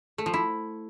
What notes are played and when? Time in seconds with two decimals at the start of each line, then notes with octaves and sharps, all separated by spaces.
0.18 A3
0.26 F3
0.34 E4